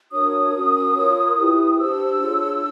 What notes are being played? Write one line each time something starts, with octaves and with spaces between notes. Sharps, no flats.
D4 F#4 A#4 C#5 D#6
C#4 F#4 A#4
F4 A#4 C#5
E4 G4 B4
D4 G4 C5 E6
D4 F4 G#4 C#5